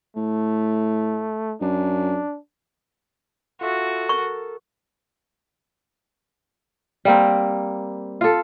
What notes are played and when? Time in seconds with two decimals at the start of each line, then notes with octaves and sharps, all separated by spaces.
0.16 A2 A3
1.61 F#2 D4
3.61 F4 F#4 A4 E5
4.09 A#4 C#6
7.05 G3 A#3 C4
8.21 F4 A4